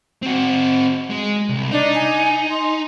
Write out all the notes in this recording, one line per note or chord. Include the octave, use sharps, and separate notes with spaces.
C4 F#4
G#3
C2
D4 D#4
G#5
C6